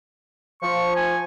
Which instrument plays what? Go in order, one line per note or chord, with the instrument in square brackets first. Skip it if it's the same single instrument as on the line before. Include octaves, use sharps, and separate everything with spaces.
[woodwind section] F3 [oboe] C#6
[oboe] G#5